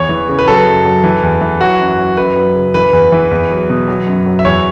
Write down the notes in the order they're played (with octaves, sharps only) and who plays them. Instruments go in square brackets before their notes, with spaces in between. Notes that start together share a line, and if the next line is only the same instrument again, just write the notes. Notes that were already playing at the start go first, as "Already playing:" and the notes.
Already playing: [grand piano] E2 C#5
E3
C#3
B4
F#3 A4
F#2
F#3
E3
E2
E3
F#3 F#4
F#2
F#3
F#2 B4
F#3
C#3
E3 B4
E2
E3
E2
F#3
B2
F#3
F#2
F#3
E5
E2 C#5